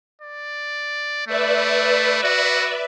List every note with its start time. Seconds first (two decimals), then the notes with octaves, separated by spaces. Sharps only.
0.22 D5
1.28 A3 B4 D5 E5
2.24 F#4